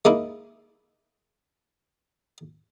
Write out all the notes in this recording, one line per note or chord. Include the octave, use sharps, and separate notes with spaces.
G#3 A#3 D#4 E4